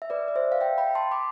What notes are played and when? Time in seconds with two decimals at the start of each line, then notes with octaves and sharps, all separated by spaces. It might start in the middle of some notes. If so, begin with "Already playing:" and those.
0.02 E5
0.10 B4 D5
0.28 D5
0.36 C5 E5
0.52 F5
0.61 E5 G5
0.78 G5 B5
0.95 A5 C6
1.11 B5 D6